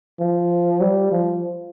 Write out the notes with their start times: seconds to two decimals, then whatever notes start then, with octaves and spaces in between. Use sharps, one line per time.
0.19 F3
0.81 G3
1.11 F3